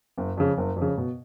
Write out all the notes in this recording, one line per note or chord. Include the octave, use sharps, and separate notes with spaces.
F#1
F2 C#3
F#1
F2
C#3
B2